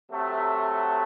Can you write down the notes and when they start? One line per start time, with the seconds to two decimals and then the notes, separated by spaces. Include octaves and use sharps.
0.11 C3 F#3 A3